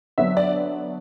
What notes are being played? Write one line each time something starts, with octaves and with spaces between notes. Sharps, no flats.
D3 F#3 B3 D4 E5
D5